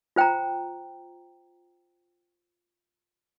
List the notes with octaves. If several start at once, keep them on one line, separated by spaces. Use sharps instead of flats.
F4 C5 G5 A#5